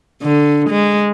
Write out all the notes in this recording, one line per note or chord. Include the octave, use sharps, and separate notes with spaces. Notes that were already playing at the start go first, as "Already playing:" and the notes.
D3
G#3